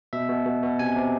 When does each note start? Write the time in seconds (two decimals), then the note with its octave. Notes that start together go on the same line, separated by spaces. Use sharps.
0.13 B2 E5
0.29 B2
0.46 B2
0.63 B2
0.79 C3 G#5
0.97 C3